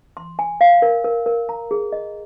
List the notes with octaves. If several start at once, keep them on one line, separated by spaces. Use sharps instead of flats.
C6
G#5
F5
A#4
A#4
A#4
A#5
G#4
D#5